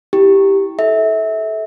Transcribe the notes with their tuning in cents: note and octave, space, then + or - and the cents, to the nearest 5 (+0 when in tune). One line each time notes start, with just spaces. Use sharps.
E4 -20 G4 +0
A4 -25 E5 -25